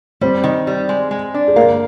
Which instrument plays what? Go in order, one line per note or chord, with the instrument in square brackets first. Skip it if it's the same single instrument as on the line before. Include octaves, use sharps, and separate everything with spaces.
[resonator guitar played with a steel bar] G3 [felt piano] C4 C5
[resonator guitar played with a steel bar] D#3
G3
G#3
G#3
D4
[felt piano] G#4
[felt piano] A#3 A#4 [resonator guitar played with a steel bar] F5